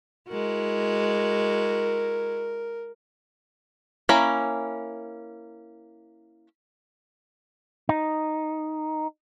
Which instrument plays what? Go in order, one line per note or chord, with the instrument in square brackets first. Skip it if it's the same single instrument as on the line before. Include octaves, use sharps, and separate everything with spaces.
[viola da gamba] G#3 E4 F#4 [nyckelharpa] A#4
[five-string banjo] A#3 C#4 E4 A#5 B5
[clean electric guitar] D#4